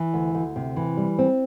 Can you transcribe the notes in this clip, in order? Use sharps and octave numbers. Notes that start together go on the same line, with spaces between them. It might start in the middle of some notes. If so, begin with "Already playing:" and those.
Already playing: E3
D2
D2
C3
E3
G3
C4